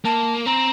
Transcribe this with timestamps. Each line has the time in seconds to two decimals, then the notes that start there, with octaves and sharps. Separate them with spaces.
0.05 A#3 A5
0.46 C4 A#5